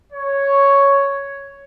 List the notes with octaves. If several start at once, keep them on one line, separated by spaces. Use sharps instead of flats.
C#5